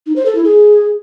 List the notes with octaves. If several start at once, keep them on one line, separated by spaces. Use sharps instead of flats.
D#4
C5
A4
E4
G#4